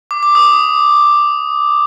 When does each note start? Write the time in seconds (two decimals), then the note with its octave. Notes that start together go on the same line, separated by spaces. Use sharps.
0.11 D6
0.23 D6
0.35 D#6